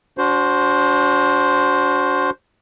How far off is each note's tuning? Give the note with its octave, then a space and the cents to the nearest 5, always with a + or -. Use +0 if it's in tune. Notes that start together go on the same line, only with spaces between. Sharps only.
D4 -35 F#4 +0 C5 +0